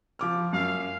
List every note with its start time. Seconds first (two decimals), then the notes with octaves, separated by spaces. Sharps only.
0.19 F3 D6 F6
0.53 F#2 F5